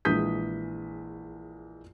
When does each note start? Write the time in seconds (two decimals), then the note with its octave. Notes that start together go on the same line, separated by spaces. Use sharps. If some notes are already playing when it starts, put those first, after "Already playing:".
0.05 A#1 E3 G#3 D#6 G6 B6